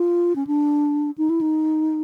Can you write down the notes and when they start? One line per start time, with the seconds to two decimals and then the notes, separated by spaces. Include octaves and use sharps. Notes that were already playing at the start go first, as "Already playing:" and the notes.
Already playing: F4
0.36 C#4
0.47 D4
1.18 D#4
1.30 E4
1.41 D#4